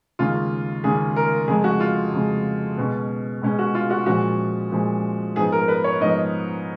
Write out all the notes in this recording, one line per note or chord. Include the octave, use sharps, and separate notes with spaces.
D#2 C#3 G#3 C#4 F4
D#2 C#3 G#3 C#4 G#4
A#4
F2 C#3 G#3 G#4
F#4
F4
F2 C#3 G#3
B2 G#3 C#4
B2 G#3 C#4
F#4
F4
F#4
A#2 F3 G#3 C#4 F#4
A#2 F3 G#3 C#4
G#2 F3 B3 G#4
A#4
B4
C#5
G#2 F3 B3 D#5